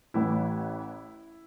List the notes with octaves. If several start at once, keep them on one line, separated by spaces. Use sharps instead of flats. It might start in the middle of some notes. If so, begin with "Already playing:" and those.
A1 A2 E3 E4